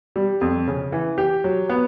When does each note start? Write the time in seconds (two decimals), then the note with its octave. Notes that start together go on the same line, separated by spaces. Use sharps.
0.16 G3
0.41 F2
0.68 C#3
0.92 E3
1.18 G4
1.44 F#3
1.69 B3